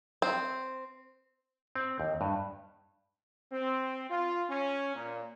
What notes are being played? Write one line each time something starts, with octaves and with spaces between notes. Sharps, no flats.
C4
C4
D#2
G2
C4
F4
C#4
A#2